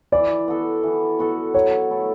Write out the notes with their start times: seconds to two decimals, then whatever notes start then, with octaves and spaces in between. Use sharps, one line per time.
0.12 E3 D5
0.48 B3 F#4 A4
0.83 E3
1.19 B3 F#4 A4
1.54 F#3 C#5
1.90 A3 E4 A4